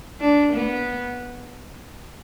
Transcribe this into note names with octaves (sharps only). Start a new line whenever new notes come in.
D4
B3